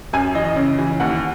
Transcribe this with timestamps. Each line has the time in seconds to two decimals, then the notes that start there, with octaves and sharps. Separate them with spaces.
0.13 F#2 G#5
0.35 E3 D#5
0.45 D#5
0.56 C#3
0.78 E3
1.00 D#2 F#5